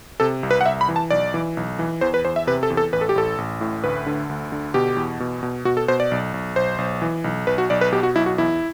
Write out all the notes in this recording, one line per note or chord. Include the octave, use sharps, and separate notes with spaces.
C3 A4
C2
B4
F#5
C2 E5
B5
E3
A5
B1 D5
E3
B1
E3
E2 C5
B4
E2 C5
E5
C3 B4
A4
E2
A4
A1 B4
A4
G4
A1 A4
A1
A2
D2 B4
D3
D2
D3
B2 G4
E2
B2
B2
B2 F#4
A4
B2 C5
D5
B1
B1
B1 C5
B1
E3
B1
B1 B4
F#4
B1 D5
B4
B2 G4
F#4
B1 E4
F#4
E2 E4